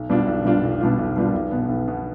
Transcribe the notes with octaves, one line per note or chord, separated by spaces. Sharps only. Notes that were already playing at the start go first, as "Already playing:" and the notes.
Already playing: B1
B2 G3 D4 F4
B1
B2 G3 D4 F4
B1
B2 G3 D4 F4
B1
B2 G3 D4 F4
B1
B2 B3
B1
B2 B3